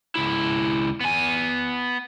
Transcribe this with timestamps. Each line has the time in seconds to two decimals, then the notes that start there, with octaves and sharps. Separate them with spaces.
0.15 C#2 E4
1.01 B3 G#5